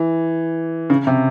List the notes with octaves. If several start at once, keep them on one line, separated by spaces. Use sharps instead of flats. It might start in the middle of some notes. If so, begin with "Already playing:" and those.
Already playing: E3
C#3
C3